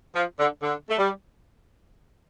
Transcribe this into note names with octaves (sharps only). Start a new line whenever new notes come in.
F3
D3
D3
A3
G3